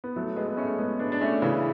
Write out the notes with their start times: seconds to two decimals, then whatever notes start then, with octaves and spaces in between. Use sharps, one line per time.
0.04 B3
0.16 F#3 A3
0.36 G#3 B3
0.47 B3
0.57 A3 C#4
0.79 G#3 B3
0.99 B3 D4
1.12 D4
1.21 A3 C#4
1.42 C#3 E3